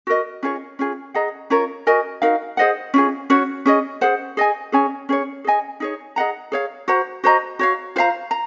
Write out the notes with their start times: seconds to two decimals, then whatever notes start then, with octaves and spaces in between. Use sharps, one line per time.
0.07 F#4 A#4 D#5
0.43 C#4 F4 G#4 C#5
0.79 C#4 F4 G#4
1.14 G#4 D#5 F#5 A#5
1.50 C#4 F4 A#4 C#5
1.87 F#4 A#4 D#5 G#5
2.22 D#4 F#4 A#4 F5
2.57 G#4 C5 D#5 F#5
2.94 C#4 F4 G#4
3.30 C#4 F#4 C#5
3.66 C#4 G#4 D#5
4.01 G#4 C5 F#5
4.37 G#4 D#5 G#5
4.72 C#4 G#4 C#5 G#5
5.09 C#4 G#4 C#5
5.45 G#4 D#5 G#5
5.80 D#4 G#4 C#5
6.16 G#4 D#5 F#5 A#5
6.52 G#4 C#5 F5
6.88 F#4 C5 F#5 A#5
7.24 F#4 C5 D#5 A#5
7.59 F#4 C#5 F5
7.96 F4 C5 F5 A#5
8.31 A#5